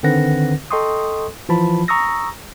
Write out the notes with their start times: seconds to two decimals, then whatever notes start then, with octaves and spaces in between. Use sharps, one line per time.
0.03 D3 D#3 C4 B4 F#5 A#6
0.71 A4 D#5 G5 C6 C#6 D#6
1.49 E3 F3 F4 A5 B5
1.88 A#5 C#6 D#6 E6 A#6